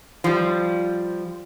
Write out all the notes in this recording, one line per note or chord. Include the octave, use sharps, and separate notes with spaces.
F3 G3